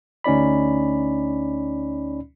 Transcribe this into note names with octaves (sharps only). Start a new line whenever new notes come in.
D2 C#4 D#4 D5 B5